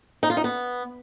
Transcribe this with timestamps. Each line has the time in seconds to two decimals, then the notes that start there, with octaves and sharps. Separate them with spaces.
0.23 D#4
0.30 F4
0.37 D#4
0.44 B3